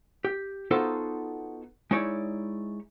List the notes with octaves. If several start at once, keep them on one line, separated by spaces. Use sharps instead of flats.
G4
B3 D#4 F4 F#4 A4 C5
G#3 D#4 E4 C#5 D5